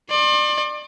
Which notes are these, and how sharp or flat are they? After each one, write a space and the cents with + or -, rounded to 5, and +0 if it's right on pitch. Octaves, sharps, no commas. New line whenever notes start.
D5 +30 C6 +45